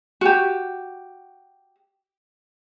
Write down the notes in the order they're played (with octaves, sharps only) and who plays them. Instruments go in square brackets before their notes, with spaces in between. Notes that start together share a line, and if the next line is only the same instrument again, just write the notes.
[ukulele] F#4 G4